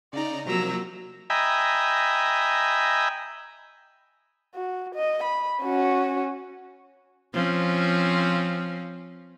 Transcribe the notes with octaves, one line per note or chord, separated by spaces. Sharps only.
C#3 D#4 D5 A#5
C3 F3 F#3 A#3 A#5 E6
D#5 E5 G5 G#5 A#5 B5
F#4
D#5
B5
C#4 F#4
F3 C4 C#4